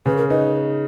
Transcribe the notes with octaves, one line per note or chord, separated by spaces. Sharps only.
C#3 B4
A#4
D#4 B4